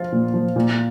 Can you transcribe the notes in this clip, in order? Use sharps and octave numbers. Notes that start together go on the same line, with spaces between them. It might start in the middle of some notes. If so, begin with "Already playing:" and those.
Already playing: F3 F4
A#2
F3
A#2